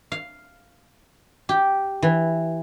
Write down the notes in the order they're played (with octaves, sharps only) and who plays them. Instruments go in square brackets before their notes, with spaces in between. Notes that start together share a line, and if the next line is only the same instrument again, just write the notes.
[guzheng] F5
G4
E3